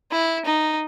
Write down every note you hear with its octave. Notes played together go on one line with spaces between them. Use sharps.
E4
D#4